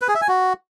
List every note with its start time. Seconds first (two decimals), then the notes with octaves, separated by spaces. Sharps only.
0.02 B4
0.08 G#4
0.15 E5
0.21 G#5
0.28 F#4